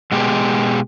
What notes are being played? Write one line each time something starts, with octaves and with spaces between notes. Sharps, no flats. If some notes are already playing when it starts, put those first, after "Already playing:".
B2 G#3 G4